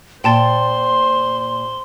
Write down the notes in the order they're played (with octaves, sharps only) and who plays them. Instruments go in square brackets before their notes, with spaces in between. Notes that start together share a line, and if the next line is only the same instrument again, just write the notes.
[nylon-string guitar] A#2 [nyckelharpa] C5 [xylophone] G5 A5 A6 [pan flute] C6